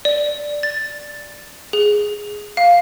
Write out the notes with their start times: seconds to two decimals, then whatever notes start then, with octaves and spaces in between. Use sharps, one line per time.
0.05 D5
0.63 A6
1.73 G#4
2.57 F5